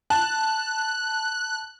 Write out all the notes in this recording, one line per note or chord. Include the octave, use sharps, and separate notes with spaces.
A5 F#6